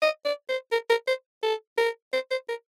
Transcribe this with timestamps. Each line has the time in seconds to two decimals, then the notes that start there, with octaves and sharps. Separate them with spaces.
0.02 D#5
0.25 D5
0.49 C5
0.72 A#4
0.90 A#4
1.07 C5
1.43 A4
1.78 A#4
2.13 C5
2.31 C5
2.49 A#4